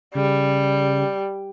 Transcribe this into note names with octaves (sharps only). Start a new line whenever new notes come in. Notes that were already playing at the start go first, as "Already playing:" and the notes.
C#3 G3